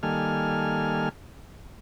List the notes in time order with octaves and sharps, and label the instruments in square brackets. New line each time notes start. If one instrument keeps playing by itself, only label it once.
[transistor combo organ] D#3 G3 A#3 A4 G#5 F6